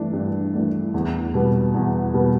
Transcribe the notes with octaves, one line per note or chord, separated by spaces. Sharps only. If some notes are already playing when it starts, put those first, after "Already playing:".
Already playing: G2 E3 A3 D4
G2
E3 A3 D4
E2
B2 G3 B3
E2
B2 G3 B3